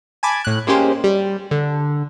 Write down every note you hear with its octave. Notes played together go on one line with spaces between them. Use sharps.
G#5 A5 B5 D6 G#6
A2 F#6
G#3 A#3 C#4 G4 C5
G3
D3